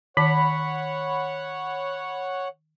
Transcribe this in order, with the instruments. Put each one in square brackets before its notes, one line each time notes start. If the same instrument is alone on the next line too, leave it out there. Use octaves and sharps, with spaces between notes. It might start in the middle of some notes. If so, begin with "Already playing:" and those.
[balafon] D#3 A5 [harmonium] C#5 F#5 [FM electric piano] B5